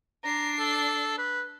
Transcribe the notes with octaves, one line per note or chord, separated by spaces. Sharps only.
D4 A#5 C7
A4
B4